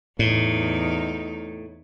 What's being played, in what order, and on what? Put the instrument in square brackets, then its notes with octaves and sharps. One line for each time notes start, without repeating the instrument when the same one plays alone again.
[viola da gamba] E2 D#4 [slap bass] A2